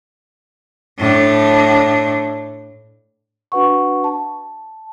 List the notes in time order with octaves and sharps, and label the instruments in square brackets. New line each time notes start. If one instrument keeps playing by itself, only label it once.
[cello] A2 D4
[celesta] D4 F#4 B4 F#5 C#6
A5